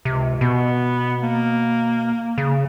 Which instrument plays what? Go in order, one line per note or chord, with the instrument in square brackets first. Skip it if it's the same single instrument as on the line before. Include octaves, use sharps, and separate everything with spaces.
[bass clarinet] C#2 [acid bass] C3
[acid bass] B2 [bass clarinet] B3
[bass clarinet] A#3
[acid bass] C#3